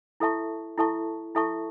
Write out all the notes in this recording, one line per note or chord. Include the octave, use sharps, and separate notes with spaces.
E4 A4 E5 A5 C#6
E4 A4 E5 A5 C#6
E4 A4 E5 A5 C#6